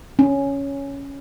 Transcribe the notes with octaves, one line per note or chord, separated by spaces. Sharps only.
C#4